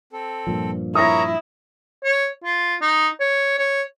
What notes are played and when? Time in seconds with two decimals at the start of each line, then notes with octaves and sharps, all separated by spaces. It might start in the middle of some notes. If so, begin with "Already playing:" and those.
0.13 C4 A4
0.47 G2 A#2 F3
0.95 E4 A#4 C#5 A#5 D#6 A#6
2.04 C#5
2.44 F4
2.82 D#4
3.20 C#5
3.59 C#5